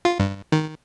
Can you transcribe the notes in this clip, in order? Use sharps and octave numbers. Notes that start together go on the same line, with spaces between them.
F4
G2
D#3